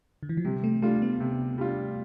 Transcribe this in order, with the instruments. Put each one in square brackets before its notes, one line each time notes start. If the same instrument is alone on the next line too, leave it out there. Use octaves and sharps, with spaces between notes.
[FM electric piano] D3
E3
F3
[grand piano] C3 [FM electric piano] G3
[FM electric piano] A3
[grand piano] G3 D4 F4 [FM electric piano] A3
[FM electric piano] B3
[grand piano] C3
G3 D4 F4